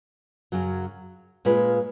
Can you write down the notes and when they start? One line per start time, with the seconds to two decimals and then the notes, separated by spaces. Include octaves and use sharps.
0.52 F#2 C#3 F#3
1.45 A#2 G#3 C#4 F4 B4